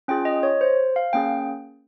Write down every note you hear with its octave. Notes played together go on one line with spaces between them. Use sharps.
C#4 F4 G#4 G5
D#5
C#5
C5
F5
A#3 C#4 G#4 G5